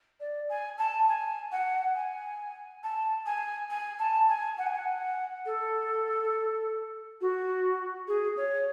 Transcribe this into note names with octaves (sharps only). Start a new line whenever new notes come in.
D5
G#5
A5
G#5
F#5
G#5
A5
G#5
G#5
A5
G#5
F#5
G#5
F#5
A4
F#4
G#4
C#5